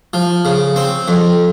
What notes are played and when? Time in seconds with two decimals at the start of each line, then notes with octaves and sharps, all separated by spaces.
0.14 F3
0.45 C#3
0.76 C4
1.08 F2